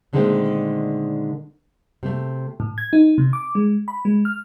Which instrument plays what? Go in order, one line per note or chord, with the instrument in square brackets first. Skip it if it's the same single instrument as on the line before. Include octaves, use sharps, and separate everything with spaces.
[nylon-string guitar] A#2 D3 D#3 G#3 A3 C4
C3 A3
[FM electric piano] A2
G#6
D#4
C3
D6
G#3
B5
G#3
F6